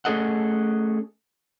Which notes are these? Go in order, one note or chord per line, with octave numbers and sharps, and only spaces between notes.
A3 C#4 G#4 A4 D#5 F#5